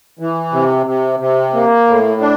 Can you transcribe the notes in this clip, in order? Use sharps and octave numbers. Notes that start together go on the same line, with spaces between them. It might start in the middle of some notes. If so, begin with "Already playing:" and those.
E3
C3
C3
C3
A#3
A2
D4